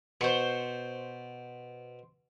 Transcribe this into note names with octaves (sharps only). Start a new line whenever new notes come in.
B2 C5 C#6